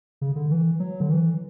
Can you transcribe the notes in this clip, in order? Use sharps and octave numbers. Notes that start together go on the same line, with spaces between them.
C#3
D3
E3
F#3
D3
E3